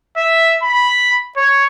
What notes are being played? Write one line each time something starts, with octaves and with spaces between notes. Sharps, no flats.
E5
B5
C#5